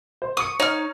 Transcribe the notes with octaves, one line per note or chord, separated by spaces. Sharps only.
C5
C#6 D#6 C#7
D#4 C#5 F6